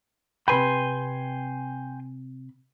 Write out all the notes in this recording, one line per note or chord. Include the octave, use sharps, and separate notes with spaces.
C3 B4 G5 G#5 B5 C6